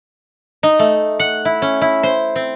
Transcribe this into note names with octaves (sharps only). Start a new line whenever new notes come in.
D#4
A3
F#5
E4
C#4
E4
C5
C4